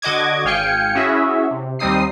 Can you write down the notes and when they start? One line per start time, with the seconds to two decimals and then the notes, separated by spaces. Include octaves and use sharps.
0.02 D3 F#4 D#5 D6 G#6
0.45 G#1 F5 G5 G#5 C#7
0.95 C#4 E4 F#4 G#4 E5
1.51 C3
1.79 D#2 G3 C4 D#4 D#6 C7